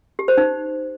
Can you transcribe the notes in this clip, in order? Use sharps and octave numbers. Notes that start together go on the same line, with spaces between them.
G4
C5
D#4